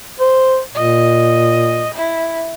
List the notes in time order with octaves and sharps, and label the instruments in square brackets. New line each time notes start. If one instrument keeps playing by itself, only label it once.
[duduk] C5
[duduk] A#2 [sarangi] D#5
[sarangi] E4